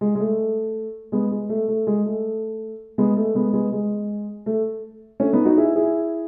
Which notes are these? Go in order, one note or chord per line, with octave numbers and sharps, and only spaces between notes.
G#3
G#3
A3
G#3 B3
G#3
A3
A3
G#3
A3
G#3 B3
A3
G#3 B3
G#3 B3
G#3
A3
A3 C#4
B3 D#4
D#4 F#4
E4 G#4
E4 G#4